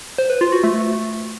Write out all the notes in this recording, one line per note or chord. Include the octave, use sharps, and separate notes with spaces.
C5
B4
F4
F#4
A3